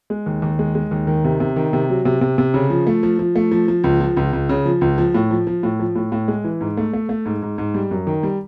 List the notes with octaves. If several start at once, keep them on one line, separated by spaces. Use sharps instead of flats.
G#3
D#2
D#2
G#3
G#3
D#2
D#3
C3
C3
D#3
C3
F#3
C3
C3
C3
C#3
F3
A3
F3
F3
A3
F3
F3
C#2
F3
C#2
C#2
C#3
F3
C#2
F3
A2
F3
F3
A2
F3
A2
A2
G#3
E3
G#2
A3
A3
A3
G#2
G#2
G#2
G3
F#2
D#3
G3